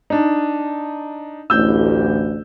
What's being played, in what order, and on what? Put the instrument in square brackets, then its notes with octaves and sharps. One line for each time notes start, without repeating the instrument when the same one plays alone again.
[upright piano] D4 D#4
[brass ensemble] A1 D2 [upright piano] E6 G6